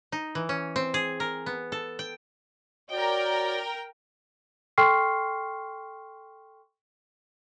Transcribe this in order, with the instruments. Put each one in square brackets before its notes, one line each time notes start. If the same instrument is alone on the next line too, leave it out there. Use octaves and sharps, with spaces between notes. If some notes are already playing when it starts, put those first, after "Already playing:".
[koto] D#4
E3
C#4
C4
G#4
A#4
B3
A4
G5
[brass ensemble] F#4 C#5 D5 [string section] A#4 G5
[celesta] A4 G5 C6 C#6 F6 C7